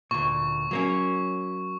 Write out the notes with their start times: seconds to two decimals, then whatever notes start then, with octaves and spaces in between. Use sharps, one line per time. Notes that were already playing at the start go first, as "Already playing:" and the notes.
0.11 D2 A#2 C#6
0.71 F#3 A#3 C#4